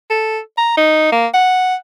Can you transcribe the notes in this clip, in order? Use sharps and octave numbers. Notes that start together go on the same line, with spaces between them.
A4
A#5
D#4
A#3
F#5